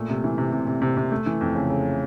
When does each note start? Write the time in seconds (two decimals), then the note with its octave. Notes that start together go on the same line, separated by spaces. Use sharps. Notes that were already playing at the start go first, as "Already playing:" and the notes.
Already playing: A#2 A3
0.09 C3
0.24 E3
0.38 C3
0.52 C3
0.67 C3
0.82 C3
0.97 C3
1.12 A3
1.26 E3
1.41 F2
1.55 C#3
1.70 C#3